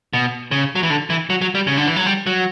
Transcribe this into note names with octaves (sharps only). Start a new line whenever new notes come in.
B2
C#3
F#3
E3
D3
E3
F#3
F#3
G3
C#3
D3
E3
F#3
G3
F#3